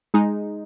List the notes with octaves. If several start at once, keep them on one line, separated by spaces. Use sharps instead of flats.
G#3 D#4